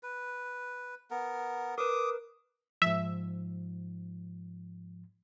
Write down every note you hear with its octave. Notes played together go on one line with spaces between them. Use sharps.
B4
B3 A#4
A#4 B4 D6 D#6
G#2 F3 E5